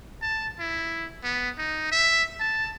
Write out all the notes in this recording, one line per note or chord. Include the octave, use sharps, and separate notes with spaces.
A5
E4
B3
D#4
E5
A5